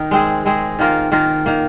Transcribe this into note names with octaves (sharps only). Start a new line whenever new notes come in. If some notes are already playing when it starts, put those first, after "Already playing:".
Already playing: D#3 D#4 A#4
G#3 C4 G#4
G#3 C4 G#4
D#3 A#3 F4 A#4
D#3 A#3 F4 A#4
D#3 A#3